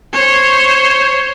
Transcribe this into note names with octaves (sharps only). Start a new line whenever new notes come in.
C5 C#5